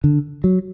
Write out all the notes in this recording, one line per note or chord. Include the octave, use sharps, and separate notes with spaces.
D3
F#3